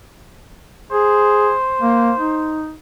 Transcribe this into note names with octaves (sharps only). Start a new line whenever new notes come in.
G#4 C5
A#3
D#4